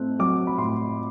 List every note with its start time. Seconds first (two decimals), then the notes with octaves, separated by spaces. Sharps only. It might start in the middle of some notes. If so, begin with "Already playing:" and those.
Already playing: A2 A3 C4 F#6
0.19 F#3 D6
0.47 B5
0.58 A2 C6